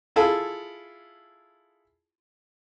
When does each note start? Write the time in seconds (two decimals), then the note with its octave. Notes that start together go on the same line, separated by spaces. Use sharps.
0.16 E4 F4 G#4 A4